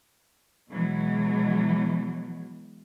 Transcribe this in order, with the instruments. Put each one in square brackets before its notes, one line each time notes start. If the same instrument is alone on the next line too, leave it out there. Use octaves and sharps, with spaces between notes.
[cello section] B2 E3 F#3 G#3